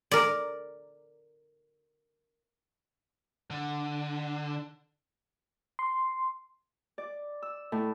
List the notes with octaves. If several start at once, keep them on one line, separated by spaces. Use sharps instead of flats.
A#4 D5
D3
C6
D5
E6
A2